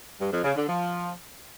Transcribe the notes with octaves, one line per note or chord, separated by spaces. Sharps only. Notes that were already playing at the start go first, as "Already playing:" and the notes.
G2
F2
C#3
D3
F3